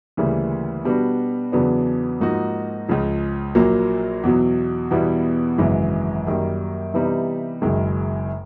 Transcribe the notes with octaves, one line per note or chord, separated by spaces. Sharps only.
D2 C#3 E3 G3 A#3
B2 G3 B3 D4 F#4
E2 C#3 F#3 B3 D4
G#2 F3 A#3 D#4 F#4
C#2 C#3 F3
A#1 A#2 F#3 A#3
E2 B2 F#3
E2 B2 G3 B3 E4
G#1 F#2 C#3 E3 G#3
F#2 D#3 G3 A#3
C3 E3 G3 B3 D#4
F#1 F#2 D#3 G#3